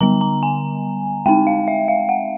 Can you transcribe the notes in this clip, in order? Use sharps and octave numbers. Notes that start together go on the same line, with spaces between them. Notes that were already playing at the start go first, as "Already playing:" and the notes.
D3 G3 B3 A#5
A#5
G#5
G#3 C4 D#4 G5
F5
E5
F5
F#5